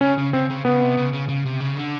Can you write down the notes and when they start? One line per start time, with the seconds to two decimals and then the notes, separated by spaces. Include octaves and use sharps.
0.01 C#3 C#4
0.18 C#3
0.33 C#3 C4
0.49 C#3
0.65 C#3 B3
0.81 C3
0.97 C#3
1.13 C#3
1.29 C#3
1.45 C3
1.60 C#3
1.77 D3